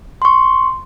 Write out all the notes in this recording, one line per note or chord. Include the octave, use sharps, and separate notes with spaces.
C6 C#6